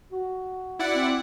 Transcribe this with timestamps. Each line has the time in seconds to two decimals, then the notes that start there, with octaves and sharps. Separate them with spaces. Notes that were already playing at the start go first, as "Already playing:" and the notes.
0.12 F#4
0.79 E4 D5 F#5
0.94 C4